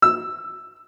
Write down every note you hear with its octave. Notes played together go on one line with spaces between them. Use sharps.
E6